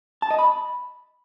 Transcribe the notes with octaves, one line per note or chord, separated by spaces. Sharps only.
A5
D#5
B5